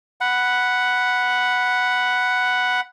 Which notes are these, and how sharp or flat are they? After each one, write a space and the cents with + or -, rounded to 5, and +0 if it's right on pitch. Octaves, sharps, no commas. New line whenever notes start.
F#5 +0 B5 +0